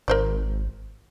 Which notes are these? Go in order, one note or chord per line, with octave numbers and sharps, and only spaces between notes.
G#1 A#4 C5 D5